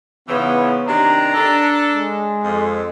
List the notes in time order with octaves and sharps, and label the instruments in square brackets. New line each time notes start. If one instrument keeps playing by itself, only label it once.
[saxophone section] G#2 C#3 E3 [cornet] B3
[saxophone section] C3 D#3 D4 [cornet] A#5
[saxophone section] D4 A4
[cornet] G#3
[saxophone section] F2